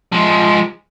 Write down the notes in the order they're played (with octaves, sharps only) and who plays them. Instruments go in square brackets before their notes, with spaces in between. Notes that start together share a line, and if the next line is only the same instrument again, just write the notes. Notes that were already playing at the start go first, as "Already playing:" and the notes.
[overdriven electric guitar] F3 G#3